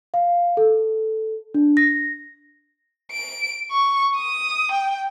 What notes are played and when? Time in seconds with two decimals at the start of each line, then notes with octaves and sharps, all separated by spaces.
0.14 F5
0.57 A4
1.54 D4
1.77 A#6
3.12 D7
3.71 C#6
4.16 D#6
4.72 G5